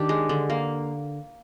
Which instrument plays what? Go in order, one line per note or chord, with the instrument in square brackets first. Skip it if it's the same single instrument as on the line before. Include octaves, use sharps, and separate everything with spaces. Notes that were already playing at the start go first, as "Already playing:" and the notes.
Already playing: [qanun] D#3 D4 G4
G#3
D3
A#3